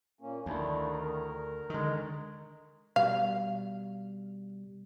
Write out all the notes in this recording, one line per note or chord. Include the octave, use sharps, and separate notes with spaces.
A#2 A#3 C#4
D2 D#3 D4 E4
A#4 A#5
D3 D#3 G#3
B2 G3 F5